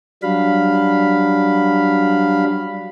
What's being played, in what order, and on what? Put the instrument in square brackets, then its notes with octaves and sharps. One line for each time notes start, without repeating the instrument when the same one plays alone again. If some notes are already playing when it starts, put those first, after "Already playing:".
[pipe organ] F#3 G3 D4 F5 B5